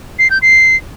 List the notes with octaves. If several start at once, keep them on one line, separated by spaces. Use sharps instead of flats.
C7
G6
C7